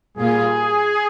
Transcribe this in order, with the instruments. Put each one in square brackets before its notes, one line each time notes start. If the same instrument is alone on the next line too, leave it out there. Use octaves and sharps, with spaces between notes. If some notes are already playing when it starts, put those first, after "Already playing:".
[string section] A#2 G3 A#3 F4 [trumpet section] G#4